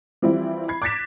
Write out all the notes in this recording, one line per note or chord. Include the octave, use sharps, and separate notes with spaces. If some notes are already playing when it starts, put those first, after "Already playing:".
E3 F3 G3 C4 E4
B5 G#6 C7
D6 F#6 G#6 A6 B6 E7